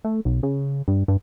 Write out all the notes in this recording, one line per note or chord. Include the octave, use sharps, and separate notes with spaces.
A3
B1
C#3
G2
G2